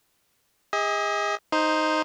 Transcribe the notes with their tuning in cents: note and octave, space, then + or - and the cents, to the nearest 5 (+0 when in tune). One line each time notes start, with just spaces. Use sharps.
G#4 -35 D#5 +35
D#4 +0 C5 +0